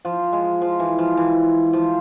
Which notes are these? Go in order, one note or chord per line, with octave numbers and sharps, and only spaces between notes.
F3
G#3
F3
E3
F3
E3
F3